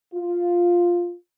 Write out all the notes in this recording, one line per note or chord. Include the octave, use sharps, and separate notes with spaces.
F4